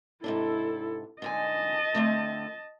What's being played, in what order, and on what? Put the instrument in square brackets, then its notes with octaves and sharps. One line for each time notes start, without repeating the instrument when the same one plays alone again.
[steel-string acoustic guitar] G#2 C3 D4 [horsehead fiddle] E4 A4
[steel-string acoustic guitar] G#2 D3 G#5 [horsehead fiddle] D#5 A5
[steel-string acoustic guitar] D3 A3 C4